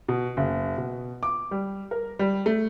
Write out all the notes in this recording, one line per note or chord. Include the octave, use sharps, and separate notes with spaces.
B2
F#1
B2
D6
G3
A#4
G3
A3